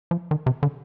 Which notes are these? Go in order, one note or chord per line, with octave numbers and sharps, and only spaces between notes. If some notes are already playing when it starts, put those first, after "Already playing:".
F3
D#3
C3
D3